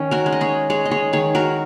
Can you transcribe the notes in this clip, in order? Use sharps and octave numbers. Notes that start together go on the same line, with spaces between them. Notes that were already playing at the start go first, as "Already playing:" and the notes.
Already playing: D#3 C#4
F#4 A#4
G#3
D#5
G#4 C#5
G#3 G#4 C#5
D#5
G#4 C#5
D#3 G#4 C#5
F#4 A#4